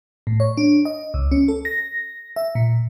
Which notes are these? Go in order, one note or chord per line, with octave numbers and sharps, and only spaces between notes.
A2
C#5
D4
D#5
C#2
C#4
A4
A#6
E5
A#2